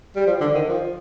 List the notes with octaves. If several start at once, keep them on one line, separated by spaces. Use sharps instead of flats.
G3
F3
D3
D#3
F3